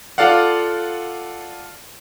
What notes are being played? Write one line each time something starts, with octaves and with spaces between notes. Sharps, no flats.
F4 A4 D5 F5 F#5